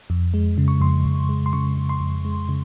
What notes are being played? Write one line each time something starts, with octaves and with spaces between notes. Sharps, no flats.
F2
G#3
C#3
C#6
F2 C6
F2
G#3
C6
C#3 C#6
F2
C6
F2
G#3
C#3